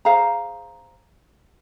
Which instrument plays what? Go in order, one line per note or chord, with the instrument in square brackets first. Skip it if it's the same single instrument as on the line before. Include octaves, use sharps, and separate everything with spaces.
[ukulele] G#4 C5 F5 A#5